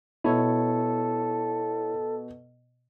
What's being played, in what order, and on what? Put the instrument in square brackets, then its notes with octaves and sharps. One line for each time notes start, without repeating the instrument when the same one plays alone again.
[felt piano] B2 [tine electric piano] E4 C#5 [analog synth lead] A4